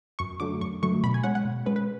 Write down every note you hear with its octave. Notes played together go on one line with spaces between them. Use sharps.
F#2 C#6
D3 F#3 A3 D6
F#2 C#6
D3 F#3 A3 C#6
B2 B5
G#5
G#3 C#4 F#5
F#5
B2
G#3 C#4 B4
B4